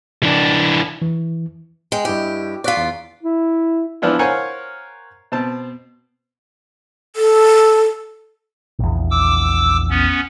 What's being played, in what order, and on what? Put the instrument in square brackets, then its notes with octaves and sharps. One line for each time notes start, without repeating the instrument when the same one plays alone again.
[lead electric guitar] E3 D4
[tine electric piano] E3
[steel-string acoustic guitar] G#3 [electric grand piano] G5
[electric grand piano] G2 E4 D#5 [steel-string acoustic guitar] G4
[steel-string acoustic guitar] F4 D5 [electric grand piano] C#6 F#6 B6
[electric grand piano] E2
[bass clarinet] E4
[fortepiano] E3 F3 B3 D4 E4 F4
A#4 C5 C#5 F5 F#5 G#5
B2 C4 A5
[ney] A4
[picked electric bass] A#1 E2
[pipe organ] D6 E6
B3 C#4